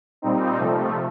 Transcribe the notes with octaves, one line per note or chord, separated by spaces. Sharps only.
A#2 G3 C4 D#4
C3 F3 A3